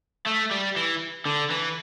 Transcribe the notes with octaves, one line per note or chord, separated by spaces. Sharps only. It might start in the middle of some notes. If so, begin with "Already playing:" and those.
A3
G3
E3
D3
E3